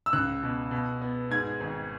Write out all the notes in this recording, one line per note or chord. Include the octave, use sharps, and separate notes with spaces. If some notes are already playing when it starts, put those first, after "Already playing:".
E6
C#2 F#6
B2
B2
B3
G#2 G#6
G#1